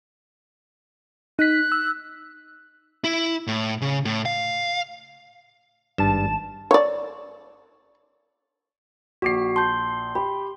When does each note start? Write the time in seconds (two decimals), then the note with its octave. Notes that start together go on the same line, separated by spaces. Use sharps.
1.39 D#4 F#6 B6
1.72 E6
3.04 E4
3.47 A2
3.82 C#3
4.05 A2
4.25 F5
5.98 G#1 G2 A5 E7
6.71 C#5 D5
9.22 A#1 F#4 D6 C7
9.56 A5 C6 G6
10.15 G4 B5